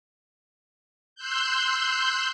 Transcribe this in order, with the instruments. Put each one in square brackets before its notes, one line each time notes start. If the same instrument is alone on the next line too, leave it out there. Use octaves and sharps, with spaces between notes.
[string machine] C6 E6 F#6 G6